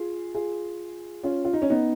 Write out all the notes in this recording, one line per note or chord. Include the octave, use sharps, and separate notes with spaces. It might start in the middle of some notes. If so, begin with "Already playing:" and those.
Already playing: F4 G#4
F4 G#4
C#4 F4
F4
D#4
C#4
B3 D#4